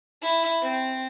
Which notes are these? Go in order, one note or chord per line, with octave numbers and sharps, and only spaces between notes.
E4
C4